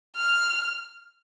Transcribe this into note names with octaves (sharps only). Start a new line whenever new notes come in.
F6